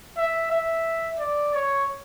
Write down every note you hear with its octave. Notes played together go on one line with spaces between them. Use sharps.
E5
E5
D5
C#5